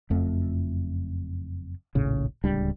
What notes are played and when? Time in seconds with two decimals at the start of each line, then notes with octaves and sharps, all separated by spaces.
0.10 F#1 F2 A3
1.95 D#1 A#1 A2 C#3
2.44 D1 C#2 G3 D4